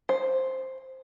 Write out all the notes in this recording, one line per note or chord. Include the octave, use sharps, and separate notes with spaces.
C5